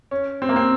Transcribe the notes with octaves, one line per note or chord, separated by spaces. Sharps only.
C#4
C4
A#3
C4